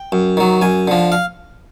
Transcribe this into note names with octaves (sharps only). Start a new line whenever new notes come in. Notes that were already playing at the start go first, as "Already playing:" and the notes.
Already playing: G5
F#2
D#3 F#3
F#2 G#5
D3 F3
F5